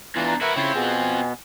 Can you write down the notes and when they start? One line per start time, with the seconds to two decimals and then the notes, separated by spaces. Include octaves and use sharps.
0.16 E2 E3 D4 F4 A#5
0.41 E4 F#4 A#4 B4 E5
0.56 C#3 C4 E4 F4 C#5
0.75 B2 B3 G#4
0.94 G#5